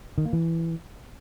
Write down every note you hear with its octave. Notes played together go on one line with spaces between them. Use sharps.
D#3
A#3
E3